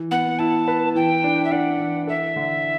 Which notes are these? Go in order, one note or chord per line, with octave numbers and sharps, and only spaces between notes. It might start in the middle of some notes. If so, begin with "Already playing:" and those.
Already playing: E3
B3 F#5
E4 A5
B4
E3 G5
D4
E5
D4 F#5
E3
A4 E5
D3